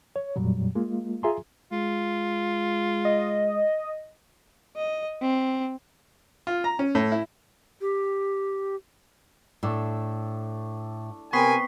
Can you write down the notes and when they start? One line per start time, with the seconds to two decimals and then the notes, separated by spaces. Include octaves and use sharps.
0.16 C#5
0.36 F2 A#2 F#3 G3
0.75 G#3 A#3 F4
1.23 F4 G#4 E5 G#5 A#5 C6
1.72 G#3 F4
3.05 D#5
4.77 D#5
5.22 C4
6.47 F4
6.64 A#5
6.79 C#4
6.95 A2
7.12 E4
7.81 G4
9.63 A2 A3 D4 E6
11.33 C3 B3 C4 A#4 G#5 C#6 B6 C7